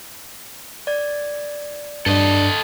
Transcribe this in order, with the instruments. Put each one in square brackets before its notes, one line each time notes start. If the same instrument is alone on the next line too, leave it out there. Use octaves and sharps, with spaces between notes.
[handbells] D5 G#6
[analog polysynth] G2 [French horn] D4 [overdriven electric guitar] A4 D#5